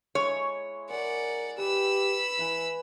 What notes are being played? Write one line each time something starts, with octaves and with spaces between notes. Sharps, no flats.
G#3 E4 C#5
G#4 A#4 D5 F#5
G4 B4 B5 E6
E3 E4 B4 G#5